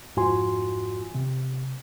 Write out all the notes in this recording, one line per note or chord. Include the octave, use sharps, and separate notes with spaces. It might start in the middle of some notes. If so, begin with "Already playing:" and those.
F2 G#2 F4 F#4 G#5 C6
C3